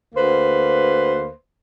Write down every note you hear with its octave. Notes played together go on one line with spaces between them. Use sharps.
D2 A#3 B4 C5